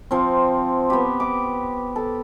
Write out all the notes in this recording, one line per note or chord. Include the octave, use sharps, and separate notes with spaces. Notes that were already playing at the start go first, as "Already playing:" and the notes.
F3 C4
B3 G4
D6
A4